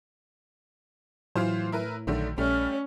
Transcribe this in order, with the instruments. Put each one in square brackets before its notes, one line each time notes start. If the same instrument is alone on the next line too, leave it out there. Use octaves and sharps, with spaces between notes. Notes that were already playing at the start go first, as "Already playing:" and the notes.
[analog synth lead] A2 [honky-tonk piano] E3 F4 C5 [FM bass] F#3
[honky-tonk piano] E4 A#4 B4
[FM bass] A#1 [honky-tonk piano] D3 D#3 A3 [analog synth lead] F#3
[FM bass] A#1 [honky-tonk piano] G3 A3 [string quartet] C#4 [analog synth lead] F6